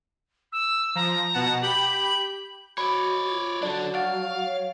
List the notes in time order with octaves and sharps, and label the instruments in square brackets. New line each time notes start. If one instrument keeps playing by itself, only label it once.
[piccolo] E6
[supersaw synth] F3 [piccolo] A#5
[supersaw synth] B2 F#5 A5
[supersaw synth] G4 B5 G6 [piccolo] F#7
[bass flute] F#4 [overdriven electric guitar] C#5 D5 [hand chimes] B5
[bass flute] F4
[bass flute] F#3 [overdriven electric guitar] D4 A4 [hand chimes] D5
[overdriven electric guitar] F5 [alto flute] F#5 [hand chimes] A6 D7
[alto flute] C#5